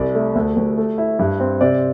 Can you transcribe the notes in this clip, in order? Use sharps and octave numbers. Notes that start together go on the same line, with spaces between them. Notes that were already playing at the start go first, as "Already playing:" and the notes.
Already playing: C2 D5
A3
D2
D2
A3
E4
G2
C4
C3 D5